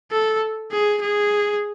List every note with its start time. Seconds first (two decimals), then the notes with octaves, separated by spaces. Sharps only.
0.12 A4
0.72 G#4
1.01 G#4